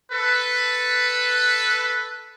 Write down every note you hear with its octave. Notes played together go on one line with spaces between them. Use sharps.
A4 B4